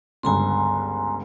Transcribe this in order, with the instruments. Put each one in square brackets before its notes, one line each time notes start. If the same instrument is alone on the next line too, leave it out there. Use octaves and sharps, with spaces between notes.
[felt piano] G1 C#2 G2 [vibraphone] G#5 A#5 C6